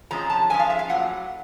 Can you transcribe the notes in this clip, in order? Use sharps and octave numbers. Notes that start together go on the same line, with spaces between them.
C3 F3 G#3 C#4 A#5
A5
C3 F3 G#3 C#4 G#5
F5
E5
F5
A2 F#3 A#3 F#5